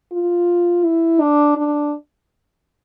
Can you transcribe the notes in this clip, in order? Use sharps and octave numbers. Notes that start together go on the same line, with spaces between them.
F4
E4
D4
D4